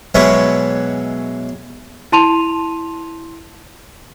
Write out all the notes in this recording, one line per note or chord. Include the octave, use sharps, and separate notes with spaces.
B2 E3 F#3 G#3 B3 C#4
E4 A5 C6 D#7 F7